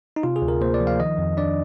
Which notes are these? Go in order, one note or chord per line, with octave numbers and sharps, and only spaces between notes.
D#4
C3 F4
G#4
D2
A#4
A#3 C5
D5
F3
F5
D#3 D#5
F2
D4 D5